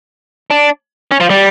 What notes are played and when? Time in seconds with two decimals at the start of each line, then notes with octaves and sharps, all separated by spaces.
0.50 D4
1.11 C#4
1.20 F3
1.30 G3